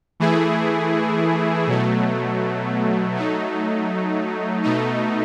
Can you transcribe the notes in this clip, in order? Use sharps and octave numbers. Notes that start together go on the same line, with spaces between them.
E3 A3 E4 G#4
B2 F#3 A3
F#3 A3 D#4
B2 A3 D#4